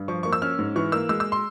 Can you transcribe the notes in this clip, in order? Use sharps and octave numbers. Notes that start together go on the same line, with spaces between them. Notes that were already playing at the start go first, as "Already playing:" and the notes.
Already playing: G2
F3 C#6
A#3 C#6
E6
C#4 F6
G#2
E3 C#6
A#3 E6
G#3 E6
E6
C6